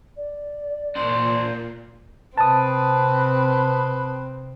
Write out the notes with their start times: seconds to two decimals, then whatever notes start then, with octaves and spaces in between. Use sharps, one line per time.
0.16 D5
0.96 A#2 D4 C5
2.37 C3 C4 B4 A5 D#6